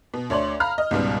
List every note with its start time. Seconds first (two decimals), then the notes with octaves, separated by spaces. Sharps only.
0.14 B2
0.30 D2 C#5 D5 C6 F#7
0.60 F5 A#5 B5 F6
0.78 D#5
0.91 C#2 G#2 B2 G3